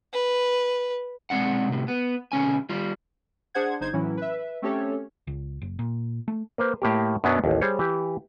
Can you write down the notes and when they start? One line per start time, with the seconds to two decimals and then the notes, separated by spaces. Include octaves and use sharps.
0.13 B4
1.30 B1 G#3 C4 D4 F#5
1.69 A2 C3
1.88 B3
2.32 B1 D3 C#4 G#5
2.69 G3 F4
3.54 D4 G#4 C5 F#5 G#6
3.80 G1 D#4 C5 G#6
3.93 A2 E3 F#3 C#4 E4
4.17 B4 E5
4.62 A3 C4 C#4 G4 A4 C#5
5.27 C#2
5.62 F#1
5.79 A#2
6.28 A3
6.58 A#3 B4 C5
6.82 A2 A#3 G4
7.24 F#2 B2 F#3 B3 C#4 D4
7.44 A1 D#2
7.61 G3 G#4 C5 C#5
7.79 E3 G4